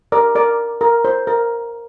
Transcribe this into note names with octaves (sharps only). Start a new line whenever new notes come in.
A#4 D5
A#4 D5
A#4
C5
A#4